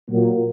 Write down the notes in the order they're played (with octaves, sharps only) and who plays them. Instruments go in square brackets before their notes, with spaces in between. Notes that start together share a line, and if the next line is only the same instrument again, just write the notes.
[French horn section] A#2 F#3 A#3